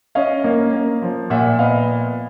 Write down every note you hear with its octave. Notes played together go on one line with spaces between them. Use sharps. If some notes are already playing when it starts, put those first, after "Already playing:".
C#4 D#5 F5
A#3
A#3
F3
A#2 E5 F#5
B3 D#5 F5